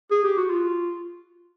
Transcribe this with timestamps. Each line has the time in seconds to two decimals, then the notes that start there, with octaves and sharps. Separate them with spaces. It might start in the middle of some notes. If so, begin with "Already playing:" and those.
0.11 G#4
0.24 G4
0.37 F#4
0.50 F4